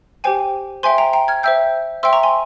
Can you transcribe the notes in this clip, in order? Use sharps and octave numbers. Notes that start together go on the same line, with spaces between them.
G4 C5 G5 G#5
C5 E5 G5 G#5 C6
G5 A#5
G5 A#5
F6 G#6
C5 E5 G5 E6 G6
C5 E5 G5 C6 E6
A#5 C#6
G#5 C6